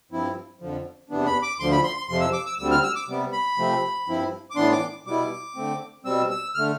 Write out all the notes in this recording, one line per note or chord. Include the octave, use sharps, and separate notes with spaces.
G2 F3 C4 E4
F2 D3 F3
E2 C3 E3 B3 D4
B5
D6
D2 D3 F3 C6
B5
C6
C6
F2 C3 F3 C6
E6
D6
E6
D2 D3 G3 C4 E6
F6
E6
D6
C3 G3 B3
B5
C3 F3 A3 C4
G2 F3 C4 E4
D6
A2 E3 B3 D4 C6
D6
B2 G3 B3 E4 D6
D3 A3 C4
B2 G3 C4 E6
E6
D3 A3 F6